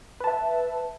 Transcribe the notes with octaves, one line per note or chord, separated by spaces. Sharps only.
B4 E5 A5